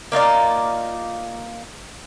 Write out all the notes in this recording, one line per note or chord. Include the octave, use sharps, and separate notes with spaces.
A#3 D#4 F4 D5